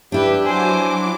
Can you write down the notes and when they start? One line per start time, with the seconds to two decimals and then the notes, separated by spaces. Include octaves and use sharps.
0.12 D4 E4 G4 B4 G5
0.45 F#3 C5 G#5 D6